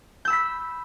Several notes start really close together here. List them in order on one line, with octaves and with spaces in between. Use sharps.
G6 E6 B5 B6